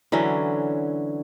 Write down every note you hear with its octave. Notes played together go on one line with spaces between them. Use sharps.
D3 E3 F#3 C#4